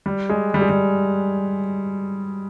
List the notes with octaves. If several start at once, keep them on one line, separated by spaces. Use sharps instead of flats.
G3
G#3
G3
G#3
G3